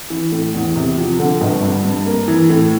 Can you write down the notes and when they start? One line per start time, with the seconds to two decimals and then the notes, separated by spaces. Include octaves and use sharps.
0.10 E3
0.32 A2
0.54 E2
0.75 C3
0.97 F3
1.19 D3
1.41 G1
1.62 G2
1.85 G2
2.06 A#3
2.28 E3
2.49 A2